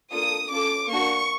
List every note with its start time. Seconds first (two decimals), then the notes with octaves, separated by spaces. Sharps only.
0.11 A#3 D4 F4 A4 D#6
0.50 C#4 F4 A4 D6
0.89 A#3 D4 F#4 C#6